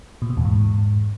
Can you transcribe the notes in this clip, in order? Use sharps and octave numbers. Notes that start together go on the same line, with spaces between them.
A#2
B2
E2
G#2